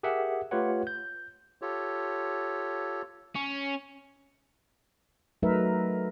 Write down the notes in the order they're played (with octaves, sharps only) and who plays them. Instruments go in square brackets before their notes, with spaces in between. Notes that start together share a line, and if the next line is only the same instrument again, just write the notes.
[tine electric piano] G4 G#4 A#4 E5 F#5
A3 F4 G4 B4 C#5 F#5
G6
[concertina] F4 G4 A4 C#5
[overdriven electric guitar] C#4
[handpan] F#3 A3 D#4 A#4 B4 E5